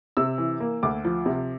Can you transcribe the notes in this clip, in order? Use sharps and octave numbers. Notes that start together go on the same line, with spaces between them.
C3 E6
E3
A#3
D2 D6
F3
C3